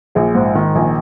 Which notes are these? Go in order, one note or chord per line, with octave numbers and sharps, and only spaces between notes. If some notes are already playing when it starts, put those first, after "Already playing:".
A#1 G#4
G#2
D#3
A#1